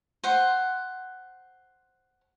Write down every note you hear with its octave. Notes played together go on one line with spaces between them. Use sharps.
C5 F#5